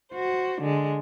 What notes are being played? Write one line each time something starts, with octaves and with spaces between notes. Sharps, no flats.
F#4 C5
D3 G#3